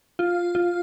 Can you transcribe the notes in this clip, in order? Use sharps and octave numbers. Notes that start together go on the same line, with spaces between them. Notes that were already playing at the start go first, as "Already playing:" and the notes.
F4
F4